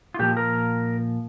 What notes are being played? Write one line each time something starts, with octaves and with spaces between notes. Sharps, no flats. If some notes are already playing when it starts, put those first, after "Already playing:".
F4
A#2 F3 G4
A#4